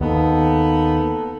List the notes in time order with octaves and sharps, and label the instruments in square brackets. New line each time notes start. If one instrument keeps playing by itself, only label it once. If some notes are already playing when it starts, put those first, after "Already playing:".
[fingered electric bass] D#2 [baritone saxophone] B3 [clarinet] D#4 [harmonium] A4